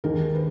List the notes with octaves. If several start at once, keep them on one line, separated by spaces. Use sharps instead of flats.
D#2 D#3 G#3 A#4
B4